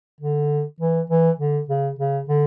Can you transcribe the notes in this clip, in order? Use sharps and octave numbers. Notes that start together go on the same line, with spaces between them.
D3
E3
E3
D3
C#3
C#3
D3